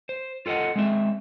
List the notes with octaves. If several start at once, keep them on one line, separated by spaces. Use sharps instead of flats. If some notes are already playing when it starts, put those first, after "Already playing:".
C5
F4 A4 C5 D#5 F#5
G#3 C4 E5